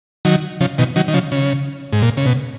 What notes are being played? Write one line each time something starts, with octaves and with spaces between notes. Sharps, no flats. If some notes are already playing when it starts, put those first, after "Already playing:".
D#3 F#3
C#3 F3
B2 D#3
D#3 F#3
D#3
C#3 F3
C#3
G#2
A#2
C#3
B2